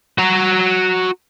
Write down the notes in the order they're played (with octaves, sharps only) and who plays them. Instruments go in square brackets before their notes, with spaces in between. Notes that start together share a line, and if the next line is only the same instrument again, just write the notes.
[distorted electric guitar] F#4 A#5